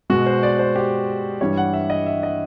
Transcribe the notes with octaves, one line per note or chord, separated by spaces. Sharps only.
B2 G#3 F#4
C5
D5
C5
G4
G2 E3 G3 C#5
F#5
E5
D#5
E5
D#5